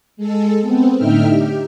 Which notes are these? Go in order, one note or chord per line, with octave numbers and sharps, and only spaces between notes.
G#3 A4
B3 C4
A2 D3 D#4 E5 G5 F6
G4